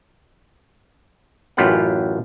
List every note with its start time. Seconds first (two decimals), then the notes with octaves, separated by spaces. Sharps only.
1.57 A1 F#2 F4 G4 B4 F#5